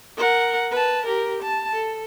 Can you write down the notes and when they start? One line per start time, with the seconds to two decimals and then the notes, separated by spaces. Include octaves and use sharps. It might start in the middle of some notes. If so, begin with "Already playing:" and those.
0.17 A#4 F#5
0.71 B4 A5
1.06 G4 A#4
1.43 A5
1.73 A4